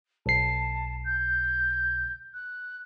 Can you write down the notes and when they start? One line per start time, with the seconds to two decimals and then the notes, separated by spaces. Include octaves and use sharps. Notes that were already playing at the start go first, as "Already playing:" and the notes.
0.26 B1 A5 C7
1.04 G6
2.33 F#6